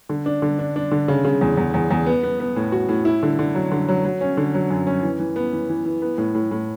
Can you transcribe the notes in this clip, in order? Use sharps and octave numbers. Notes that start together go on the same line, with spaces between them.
D3
D4
D3
D4
D4
D3
C#3
C#3
E2
E2
E2
E2
B3
B3
B3
A2
F#4
A2
E4
D3
D3
F#3
D3
F#3
F#3
C#4
D3
F#3
F#2
C#4
E3
E3
B3
E3
E3
E3
B3
A2
A2
A2